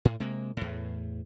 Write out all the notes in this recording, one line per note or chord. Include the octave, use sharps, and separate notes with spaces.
A2
C3 G#3 A#3
E2 A2